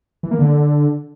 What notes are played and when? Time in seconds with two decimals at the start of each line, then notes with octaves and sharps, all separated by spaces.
0.23 E3
0.31 A#3
0.39 D3